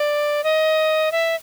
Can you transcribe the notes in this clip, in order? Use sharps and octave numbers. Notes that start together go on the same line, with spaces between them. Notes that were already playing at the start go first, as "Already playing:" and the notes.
Already playing: D5
D#5
E5